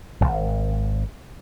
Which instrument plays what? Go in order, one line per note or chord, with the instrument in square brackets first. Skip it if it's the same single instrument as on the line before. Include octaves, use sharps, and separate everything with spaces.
[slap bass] D#1 G#1